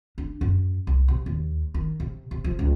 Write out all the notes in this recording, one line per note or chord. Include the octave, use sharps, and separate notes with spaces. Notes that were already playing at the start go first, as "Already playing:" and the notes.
D4
F#2
C2
C3
D#2
D#3
C3
C3
F3
C#2